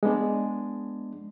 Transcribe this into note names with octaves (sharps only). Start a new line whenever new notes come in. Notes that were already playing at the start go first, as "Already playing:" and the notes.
G#3 B3 D4